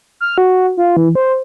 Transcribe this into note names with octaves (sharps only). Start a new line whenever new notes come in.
F6
F#4
F4
E3
C5